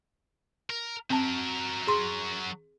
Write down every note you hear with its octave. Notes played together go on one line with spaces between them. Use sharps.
A#4
F#3 C4 A#4 A5
G#4 C6